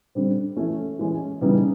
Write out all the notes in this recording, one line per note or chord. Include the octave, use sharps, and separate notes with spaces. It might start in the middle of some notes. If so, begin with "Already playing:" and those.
D3 G3 C4
E3 A3 C#4
E3 G#3 C#4
C#3 E3 G3 B3 D#4